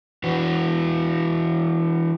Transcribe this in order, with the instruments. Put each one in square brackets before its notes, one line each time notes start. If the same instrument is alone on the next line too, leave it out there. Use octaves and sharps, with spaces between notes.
[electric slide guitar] E3 F#4 B4